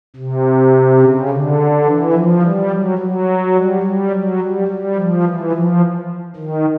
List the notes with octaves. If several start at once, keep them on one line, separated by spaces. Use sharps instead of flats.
C3
C#3
D3
E3
F3
G3
F#3
F#3
G3
G3
F#3
G3
G3
F3
E3
F3
D#3